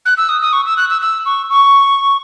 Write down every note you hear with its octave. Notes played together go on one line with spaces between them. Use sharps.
F#6
E6
D#6
D#6
C#6
E6
F#6
E6
E6
C#6
C#6